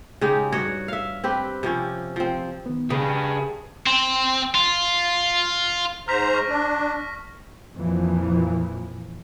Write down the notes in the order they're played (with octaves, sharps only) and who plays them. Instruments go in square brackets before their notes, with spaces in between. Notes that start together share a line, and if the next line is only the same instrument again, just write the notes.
[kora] C#3 G#3 D#4 G4
G2 F#4 C#5 D#5
E5 F5
C4 G4 B4
C3 F3 C#4
F3 C4
[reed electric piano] D#3 B3
[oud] C#3 [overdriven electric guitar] G4 B4 [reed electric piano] D#6
[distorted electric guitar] C4
F4
[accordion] G#2 C5 A#5 [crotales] F6 B6
[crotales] C#6 F6 A#6
[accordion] D4
[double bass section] F2 A#2 E3 F3